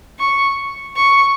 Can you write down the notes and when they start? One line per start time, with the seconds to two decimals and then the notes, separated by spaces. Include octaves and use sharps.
0.19 C#6
0.96 C#6